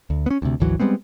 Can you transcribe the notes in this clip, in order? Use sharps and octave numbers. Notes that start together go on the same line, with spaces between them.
D2
B3 C#4
D2 C3
G#1 D2 E3 F#3
G3 G#3 B3 C4